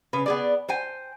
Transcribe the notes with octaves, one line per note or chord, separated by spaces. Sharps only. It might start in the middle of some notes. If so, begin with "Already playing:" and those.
C#3 B4
B3 G#4 D5
C5 G5 G#5